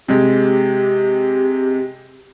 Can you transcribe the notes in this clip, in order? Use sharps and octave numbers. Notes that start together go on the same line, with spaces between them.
C3 G#3 G4